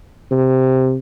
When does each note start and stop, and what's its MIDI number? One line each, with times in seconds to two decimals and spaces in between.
0.31 0.98 48